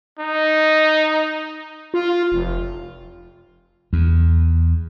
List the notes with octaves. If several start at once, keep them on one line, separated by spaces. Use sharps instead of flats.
D#4
F4
F1
E2